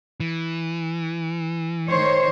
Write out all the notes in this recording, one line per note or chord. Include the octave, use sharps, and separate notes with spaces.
E3
D#3 C5 C#5